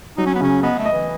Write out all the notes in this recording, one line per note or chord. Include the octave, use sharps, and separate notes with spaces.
F#3 D#4
C#4
B3
C#3 C#4
B3 D#5
A3
D#5
E3